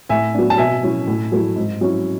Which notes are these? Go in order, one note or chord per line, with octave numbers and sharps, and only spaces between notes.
A2 E5 G#5
F#3 B3 D4
A5
B2 E5 G#5
F#3 C#4 E4
A2
F#3 A3 E4
G#2
F#3 C#4 E4